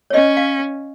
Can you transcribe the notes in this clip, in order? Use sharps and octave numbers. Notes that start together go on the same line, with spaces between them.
C#5
C#4 D#5
F5